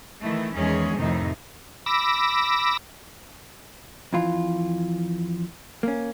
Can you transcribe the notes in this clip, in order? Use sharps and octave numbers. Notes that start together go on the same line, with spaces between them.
D#3 E3 A3 E4
E2 D#3 G#3 C#4 G#4
F2 A2 C3 D#3 D#4
B5 D6 E6 A#6
F2 E3 F4
A#3 C#4